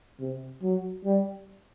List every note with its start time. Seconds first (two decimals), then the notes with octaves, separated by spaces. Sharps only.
0.19 C3
0.62 F#3
1.05 G3